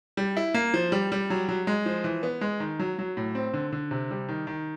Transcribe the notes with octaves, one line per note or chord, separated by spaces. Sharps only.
G3
E4
A#3
F3
G3
G3
F#3
F#3
G#3
F3
E3
B3
G#3
D#3
F#3
F#3
A2
C4
D3
D3
C3
G3
D#3
D#3